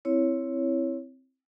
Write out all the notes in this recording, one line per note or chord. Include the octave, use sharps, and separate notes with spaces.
C4 E4 C#5